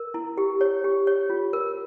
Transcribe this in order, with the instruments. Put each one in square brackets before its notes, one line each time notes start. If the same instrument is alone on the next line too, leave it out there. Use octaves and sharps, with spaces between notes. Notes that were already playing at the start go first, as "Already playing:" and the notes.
Already playing: [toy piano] A#4
E4
G4
C#5
G4
C#5
F4
A#4